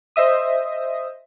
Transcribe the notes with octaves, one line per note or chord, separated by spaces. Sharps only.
C5 D#5 E5 D#6